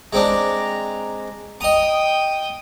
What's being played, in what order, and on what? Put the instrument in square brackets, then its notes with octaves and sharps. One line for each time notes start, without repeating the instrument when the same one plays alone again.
[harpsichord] G#3 C4 D4 [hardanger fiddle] A#5
[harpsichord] D#5 A#5 [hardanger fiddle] G5 D#6